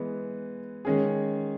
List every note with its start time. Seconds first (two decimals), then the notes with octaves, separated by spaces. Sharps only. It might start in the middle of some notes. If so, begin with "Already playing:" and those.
Already playing: E3 G#3 B3
0.85 D#3 G#3 C#4 G#4